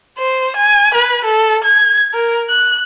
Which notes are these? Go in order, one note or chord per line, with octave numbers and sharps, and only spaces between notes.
C5
G#5
B4
A4
G#6
A#4
F#6